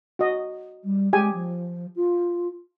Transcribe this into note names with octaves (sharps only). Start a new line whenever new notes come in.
F#4 D#5
G3
G#3 G4 G#4 G#5
F3
F4